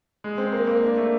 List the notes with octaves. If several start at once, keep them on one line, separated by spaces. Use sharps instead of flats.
G#3
C4
A#3
A#3
D4
A3